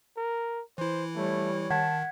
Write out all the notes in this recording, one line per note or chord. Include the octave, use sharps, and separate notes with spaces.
A#4
E3 E4 C5
G3 A3 C#5
D#3 F#5 A5 G#6 B6